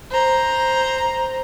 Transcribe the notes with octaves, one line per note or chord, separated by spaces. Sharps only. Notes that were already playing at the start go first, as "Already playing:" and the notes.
C5 A#5